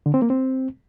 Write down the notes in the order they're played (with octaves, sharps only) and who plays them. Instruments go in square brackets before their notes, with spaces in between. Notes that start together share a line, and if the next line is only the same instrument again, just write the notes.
[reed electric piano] D3
C4
A#3
C4